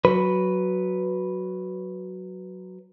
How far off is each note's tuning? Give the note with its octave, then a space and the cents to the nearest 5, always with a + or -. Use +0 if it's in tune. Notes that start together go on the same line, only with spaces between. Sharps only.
F#3 +0 B4 +0